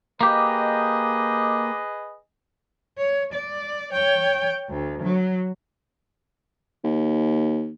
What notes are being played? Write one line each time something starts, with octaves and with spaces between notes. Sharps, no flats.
A#3 G4 G#4 B4 D#5
C#5
D5
C#5 G5
D2
F#3
D#2